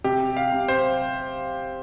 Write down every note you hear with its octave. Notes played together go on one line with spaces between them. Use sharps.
C3 G4
F5
C3
C5